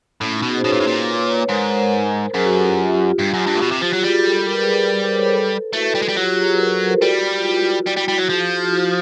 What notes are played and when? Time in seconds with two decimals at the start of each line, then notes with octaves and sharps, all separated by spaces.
0.21 A2 C#4
0.35 D#4
0.42 B2
0.50 F#4 G#4
0.58 C5
0.64 B2 B4 C#5
0.72 A#2
0.80 A2
0.87 A#2
1.06 B4 C#5
1.27 B4 C#5
1.49 G#2 A#4 C5
2.34 F#2 G#4 A#4
2.44 F#4 G#4
2.55 G4 A4
2.66 F4 G4
2.76 F4 G4
3.19 G2
3.34 F#2
3.47 G2
3.56 A#2
3.62 B2
3.72 C3
3.82 F3 F4 G4
3.93 F#3
4.04 G3 F#4 G#4
4.25 G4 A4
4.46 A#4
4.54 B4
4.61 G#4 A#4
5.03 A#4 C5
5.17 B4 C#5
5.31 A4 B4
5.73 A3 E4 F#4
5.95 G3
6.02 G#3
6.09 G3
6.16 F#3 F4 G4
6.38 F#4 G#4
6.52 B4
6.59 G#4 A#4
6.73 A4 B4
6.87 A#4 C5
7.01 G3 E4 F#4
7.38 F4
7.44 E4 F#4
7.65 F4
7.86 G3 E4 F#4
7.96 G3
8.08 G3
8.18 F#3
8.28 F3 F#4 G#4
8.71 E4 F#4